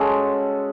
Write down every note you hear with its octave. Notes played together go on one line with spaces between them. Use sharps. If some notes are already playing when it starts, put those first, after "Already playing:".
Already playing: G#3 C#4 F#4 A4